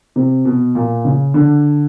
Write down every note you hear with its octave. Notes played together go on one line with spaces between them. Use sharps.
C3
B2
A#2
C#3
D3